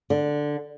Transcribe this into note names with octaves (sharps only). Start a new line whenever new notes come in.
D3